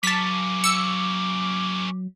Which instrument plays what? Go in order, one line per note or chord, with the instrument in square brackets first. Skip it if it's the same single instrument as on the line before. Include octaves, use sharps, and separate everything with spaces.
[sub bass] F#3 [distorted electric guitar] A#3 C#4 [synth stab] A5 B6 [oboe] D6
[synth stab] E6 C#7